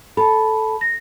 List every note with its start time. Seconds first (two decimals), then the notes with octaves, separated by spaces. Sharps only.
0.17 A4 A5 B5
0.81 A#6